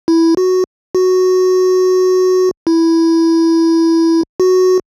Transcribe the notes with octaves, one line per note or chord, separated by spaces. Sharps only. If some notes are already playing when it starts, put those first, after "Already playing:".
E4
F#4
F#4
E4
F#4